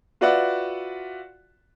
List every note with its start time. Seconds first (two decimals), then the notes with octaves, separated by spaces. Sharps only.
0.21 F4 F#4 B4 D5 E5 F#5